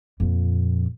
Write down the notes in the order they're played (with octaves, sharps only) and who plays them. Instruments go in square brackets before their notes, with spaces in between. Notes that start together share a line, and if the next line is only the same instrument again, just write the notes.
[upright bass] F2 A#2